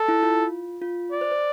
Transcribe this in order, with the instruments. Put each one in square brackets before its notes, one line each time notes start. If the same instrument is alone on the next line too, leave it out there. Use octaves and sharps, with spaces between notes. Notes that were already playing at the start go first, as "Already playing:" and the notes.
Already playing: [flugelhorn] A4
[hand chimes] E4
F4
F4
[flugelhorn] D5
[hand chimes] C5
C5